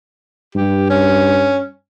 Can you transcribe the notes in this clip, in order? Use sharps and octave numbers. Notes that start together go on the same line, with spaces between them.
G2 G4
C#4